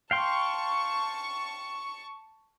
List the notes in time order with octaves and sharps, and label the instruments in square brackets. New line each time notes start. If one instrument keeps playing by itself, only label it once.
[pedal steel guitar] F5 G5 C6 [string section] A5 C#6